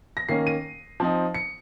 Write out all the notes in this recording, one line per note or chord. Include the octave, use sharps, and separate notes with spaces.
A#6
D#3 A#3 C#4 C7
D#7
F3 C4 D#4
C#7